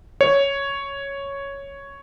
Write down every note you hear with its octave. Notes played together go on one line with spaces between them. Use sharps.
C#5